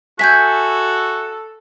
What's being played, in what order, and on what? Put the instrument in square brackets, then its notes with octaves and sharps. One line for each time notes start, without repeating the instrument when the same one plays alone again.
[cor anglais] F#4 [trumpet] A4 [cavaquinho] E5 G#5 [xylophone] G6 B6